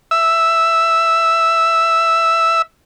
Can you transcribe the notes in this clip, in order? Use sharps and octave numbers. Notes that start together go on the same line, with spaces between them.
E5 E6